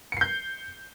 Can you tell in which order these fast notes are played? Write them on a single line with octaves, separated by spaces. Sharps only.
C#7 C7 G6